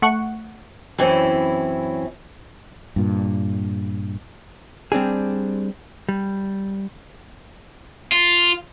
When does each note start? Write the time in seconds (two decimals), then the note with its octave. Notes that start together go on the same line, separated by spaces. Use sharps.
0.02 A3 F#5 C#6
0.98 F#2 E3 C4 C#4 E4
2.96 G2 A#2
4.92 G3 C4 D4 G#4
6.09 G3
8.12 F4